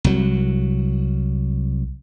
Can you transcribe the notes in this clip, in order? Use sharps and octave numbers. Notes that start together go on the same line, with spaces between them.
C2 F#3